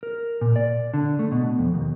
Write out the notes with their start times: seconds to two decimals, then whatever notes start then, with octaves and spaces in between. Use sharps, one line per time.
0.03 A#4
0.41 A#2
0.56 D5
0.94 D3
1.19 A3
1.32 B2
1.59 F2
1.74 D#2